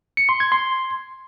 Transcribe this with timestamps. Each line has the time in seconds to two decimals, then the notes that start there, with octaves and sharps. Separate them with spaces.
0.17 C#7
0.29 C6
0.40 G#6
0.52 C6